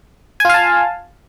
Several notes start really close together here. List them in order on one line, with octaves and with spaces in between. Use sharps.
G#5 F4 F5 A5